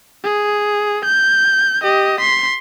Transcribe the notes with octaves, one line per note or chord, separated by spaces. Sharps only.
G#4
G6
G4 D#5
C6 B6